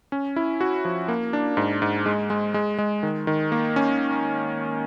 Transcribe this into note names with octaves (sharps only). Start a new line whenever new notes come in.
C#4
E4
F#4
F3
A#3
D4
G#2
G#2
G#3
G#3
G#3
G#3
D#3
D#3
A#3
C#4